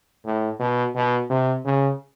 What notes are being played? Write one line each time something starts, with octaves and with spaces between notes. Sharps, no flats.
A2
B2
B2
C3
C#3